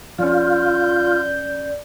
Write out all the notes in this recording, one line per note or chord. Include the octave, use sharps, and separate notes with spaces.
F2 C#4 F4 D5 G6